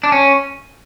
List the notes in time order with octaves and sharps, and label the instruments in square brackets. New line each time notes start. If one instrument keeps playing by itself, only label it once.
[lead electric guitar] D4
C#4